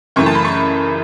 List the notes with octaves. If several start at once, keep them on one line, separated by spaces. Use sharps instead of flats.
F#2 C#3 E3 A3 C#6
A5
B5
C#6